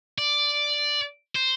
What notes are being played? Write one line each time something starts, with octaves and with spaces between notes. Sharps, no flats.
D5
C5